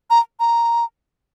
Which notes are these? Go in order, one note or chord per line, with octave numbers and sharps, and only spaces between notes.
A#5
A#5